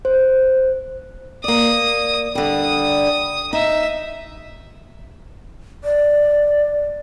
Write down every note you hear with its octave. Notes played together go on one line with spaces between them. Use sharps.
C5
A#3 D5 D#6
D3 G3 D#6
D#4 E5
D5